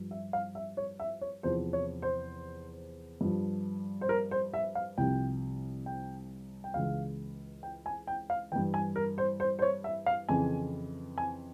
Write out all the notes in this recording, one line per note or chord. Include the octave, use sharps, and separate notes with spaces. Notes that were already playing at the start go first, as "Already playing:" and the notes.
Already playing: G2 F3
E5
F5
E5
C#5
E5
C#5
E2 C3 F3 C5
C#5
C5
G2 F3
C5
A#4
C5
E5
F5
C2 C3 F3 G5
G5
G5
C#2 C#3 E3 F5
G5
G#5
G5
F5
G2 E3 G5
G#5
A#4
C5
C5
C5
C#5
E5
F5
F2 C#3 E3 G#5
G#5